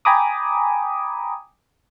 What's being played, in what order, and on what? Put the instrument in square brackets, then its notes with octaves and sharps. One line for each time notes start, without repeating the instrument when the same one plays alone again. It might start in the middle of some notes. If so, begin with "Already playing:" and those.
[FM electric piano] G5 G#5 A#5 B5 D6 D#6